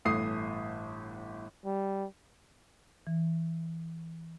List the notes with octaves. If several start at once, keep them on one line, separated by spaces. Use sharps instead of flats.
G1 A2 E3 A3 D#6 C7
G3
E3